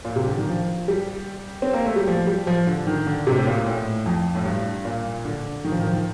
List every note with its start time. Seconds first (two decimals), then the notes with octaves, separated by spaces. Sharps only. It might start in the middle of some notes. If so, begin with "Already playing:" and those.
0.05 A#2
0.16 C3
0.27 D3
0.38 D#3
0.49 F3
0.88 G3
1.62 C4
1.73 A#3
1.85 A3
1.96 G3
2.07 F3
2.27 G3
2.47 F3
2.67 D3
2.87 D#3
3.07 D3
3.27 C3
3.37 A2
3.47 A#2
3.66 A2
4.06 F2
4.35 A2
4.45 G2
4.85 A#2
5.25 D3
5.65 D#3
5.72 F3
5.79 D#3
5.87 F3
5.93 D#3